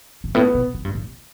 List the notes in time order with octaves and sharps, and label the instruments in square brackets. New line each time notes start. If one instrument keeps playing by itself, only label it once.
[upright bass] G2
[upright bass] A2 [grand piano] B3
[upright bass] B2
A2
G2
A2